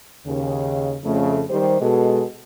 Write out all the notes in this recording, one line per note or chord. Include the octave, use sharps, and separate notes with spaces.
D#2 C#3
F2 C#3 A3
D#3 G3 G4 C5
B2 G#3 A4